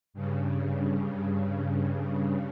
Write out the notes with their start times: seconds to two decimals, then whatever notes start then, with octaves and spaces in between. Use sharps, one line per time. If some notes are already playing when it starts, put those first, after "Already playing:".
0.14 G2 C#3